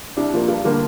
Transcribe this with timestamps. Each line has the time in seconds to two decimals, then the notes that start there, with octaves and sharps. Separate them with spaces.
0.17 C2 D4
0.33 A#2 F3 A#3
0.48 G2
0.64 D3 G3 A#3